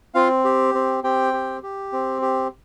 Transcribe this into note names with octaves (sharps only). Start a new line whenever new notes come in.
C4 F4 F5
G4
C4
C4 G4 G5
G4
G4
C4
G4